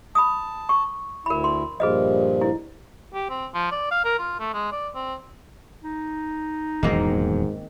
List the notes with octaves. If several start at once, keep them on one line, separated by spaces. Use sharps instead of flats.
A5 B5 D#6
C#6
D2 E4 A#4 B5
C6
G2 A#2 F3 G#4 B4 D#5
E4
G4
C4
F3
D5
F5
A#4
F4
A3
G#3
D5
C4
D#4
D#1 E2 G#2 D#3 F#3 A#3 C4